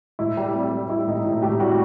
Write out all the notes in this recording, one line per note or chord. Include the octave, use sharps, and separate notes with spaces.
A2 E4
G3
C4
G3
G3 E4
A2 D#4
A2
A2 G4
G3 F#4